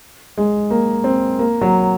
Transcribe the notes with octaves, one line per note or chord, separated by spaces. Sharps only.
G#3
A#3
C4
A#3
F#3